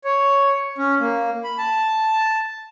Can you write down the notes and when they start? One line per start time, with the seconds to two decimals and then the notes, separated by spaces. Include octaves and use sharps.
0.04 C#5
0.78 C#4
1.00 A#3
1.44 B5
1.58 A5